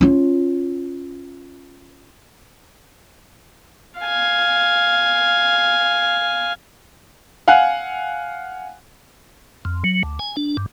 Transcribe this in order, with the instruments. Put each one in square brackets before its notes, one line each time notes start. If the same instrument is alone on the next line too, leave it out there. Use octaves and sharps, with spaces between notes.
[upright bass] C#4 F4
[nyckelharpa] F5 G#5
[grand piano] F5 F#5 G#5 F#6
[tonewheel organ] F2
F#3
D2
G#5
D4
G2